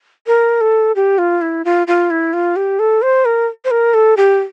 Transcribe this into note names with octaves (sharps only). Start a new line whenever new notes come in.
A#4
A4
G4
F4
E4
F4
F4
E4
F4
G4
A4
C5
A#4
C5
A#4
A4
G4